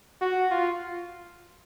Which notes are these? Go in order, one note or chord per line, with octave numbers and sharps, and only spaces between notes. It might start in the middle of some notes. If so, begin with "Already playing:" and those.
F#4
F4